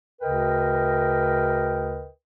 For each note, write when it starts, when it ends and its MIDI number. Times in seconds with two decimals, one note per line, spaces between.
0.21 2.07 38
0.21 2.07 49
0.21 2.07 70
0.21 2.07 71
0.21 2.07 75
0.21 2.07 79